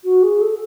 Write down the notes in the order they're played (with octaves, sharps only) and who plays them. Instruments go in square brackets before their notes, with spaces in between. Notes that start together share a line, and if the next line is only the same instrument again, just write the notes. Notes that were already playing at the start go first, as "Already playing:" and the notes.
[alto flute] F#4
G#4
A4